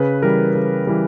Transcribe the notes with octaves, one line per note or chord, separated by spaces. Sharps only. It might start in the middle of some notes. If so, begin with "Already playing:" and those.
Already playing: C#3 B4
E3 G3 A#4
C#3
E3 G3